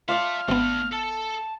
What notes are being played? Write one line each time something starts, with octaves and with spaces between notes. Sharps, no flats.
F4 D5 E5 F5 A5 F6
G#1 A3 B3 D4
A4 A5